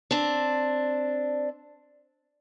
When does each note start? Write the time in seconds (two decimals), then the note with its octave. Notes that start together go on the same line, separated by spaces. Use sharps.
0.11 C4 D4